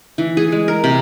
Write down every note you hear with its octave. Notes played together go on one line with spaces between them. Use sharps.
E3
G#4
G#3
A#4
C3